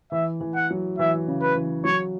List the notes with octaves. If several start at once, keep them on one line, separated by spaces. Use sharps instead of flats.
E3 E5
E3
F#5
F#3
E3 E5
C#3
B4
E3
F#3 C#5